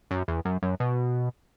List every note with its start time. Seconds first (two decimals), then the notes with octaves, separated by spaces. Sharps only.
0.11 F#2
0.28 E2
0.45 F#2
0.63 F#2
0.80 B2